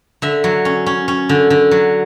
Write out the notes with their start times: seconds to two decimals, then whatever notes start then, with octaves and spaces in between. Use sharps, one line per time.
0.22 D3 E5
0.44 F#3
0.65 C#4
0.86 C#4
1.08 C#4
1.29 D3
1.50 D3
1.71 F#3